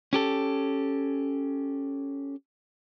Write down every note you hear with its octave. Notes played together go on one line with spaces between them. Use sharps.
C#4 G4 A4